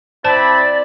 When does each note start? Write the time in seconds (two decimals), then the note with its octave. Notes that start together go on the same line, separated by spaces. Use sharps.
0.24 C4 E4 C5 D5 A5 B5 A6